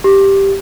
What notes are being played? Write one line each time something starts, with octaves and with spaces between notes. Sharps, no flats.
G4